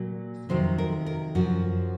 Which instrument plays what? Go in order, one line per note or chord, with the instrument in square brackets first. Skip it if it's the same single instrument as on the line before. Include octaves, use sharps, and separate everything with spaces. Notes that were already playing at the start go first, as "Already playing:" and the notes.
Already playing: [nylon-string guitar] A#2 F#3
F2 C3 D#3 F#3 C5
A#4
A#4
F#2 F3 F#4